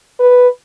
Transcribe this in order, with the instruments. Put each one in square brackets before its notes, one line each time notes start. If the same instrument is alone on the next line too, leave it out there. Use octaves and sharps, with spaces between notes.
[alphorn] B4